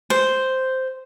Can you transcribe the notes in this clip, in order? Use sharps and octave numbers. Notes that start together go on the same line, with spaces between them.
C5